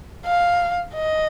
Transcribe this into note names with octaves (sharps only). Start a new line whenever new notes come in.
F5
D#5